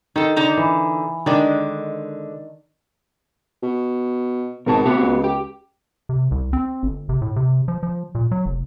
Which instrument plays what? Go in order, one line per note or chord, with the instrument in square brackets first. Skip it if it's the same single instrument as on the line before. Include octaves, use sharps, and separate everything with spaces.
[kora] D#3 [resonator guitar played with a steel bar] D#4 A4
[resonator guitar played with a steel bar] D3 D#4 A#5
[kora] E3
[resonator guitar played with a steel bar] D3 G#3 [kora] D#3 D4
[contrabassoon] B2
[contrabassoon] G#1 [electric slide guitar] B2 A5
[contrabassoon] C3 [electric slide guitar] B3 F#4 G4
[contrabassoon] C#2
[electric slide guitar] G4
[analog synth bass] C3
C2
C4
G1
C3
A2
C3
F3
F3
A#2
F#3
F1